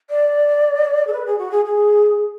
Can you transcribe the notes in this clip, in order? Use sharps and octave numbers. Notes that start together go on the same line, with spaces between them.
D5
A4
B4
G#4
F#4
G#4
G#4